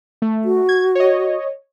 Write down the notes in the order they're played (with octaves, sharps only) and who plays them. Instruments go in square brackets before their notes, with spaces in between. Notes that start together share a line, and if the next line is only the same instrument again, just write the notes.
[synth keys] A3
[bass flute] F#4
[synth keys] G#6
C#5 D#5